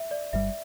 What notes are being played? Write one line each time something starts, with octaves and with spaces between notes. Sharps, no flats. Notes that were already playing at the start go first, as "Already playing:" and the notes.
Already playing: E5
D5
G1 G2 G3 E5